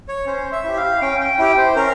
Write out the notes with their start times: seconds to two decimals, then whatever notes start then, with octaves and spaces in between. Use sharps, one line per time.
0.09 C#5
0.26 C#4 C5
0.52 E5
0.64 E4 G4
0.77 F5
1.01 C#4 G5
1.20 G5
1.39 E4 G4 G5
1.58 C5
1.76 C#4 A#4